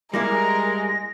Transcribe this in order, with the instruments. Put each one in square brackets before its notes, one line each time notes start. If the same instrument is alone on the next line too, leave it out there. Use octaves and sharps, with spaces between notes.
[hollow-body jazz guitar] G3 A#3 E4 [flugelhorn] G#3 [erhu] A#4 [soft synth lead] A#6